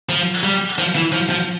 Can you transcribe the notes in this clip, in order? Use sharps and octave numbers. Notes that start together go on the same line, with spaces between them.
F3
G3
F3
E3
F3
F3